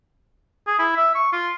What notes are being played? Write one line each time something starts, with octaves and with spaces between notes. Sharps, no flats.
G#4
E4
E5
C#6
F4